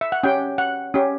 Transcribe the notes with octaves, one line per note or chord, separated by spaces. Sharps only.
E5
F#5
C#4 G4 G5
F#5
C#4 G4